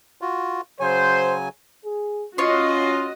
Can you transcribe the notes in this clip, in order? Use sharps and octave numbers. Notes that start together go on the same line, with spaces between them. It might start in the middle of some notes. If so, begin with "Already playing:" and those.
F4 F#4
C#3 F#3 C5 G#5
G#4
C#4 F4 F#4 C#5 D#5 C6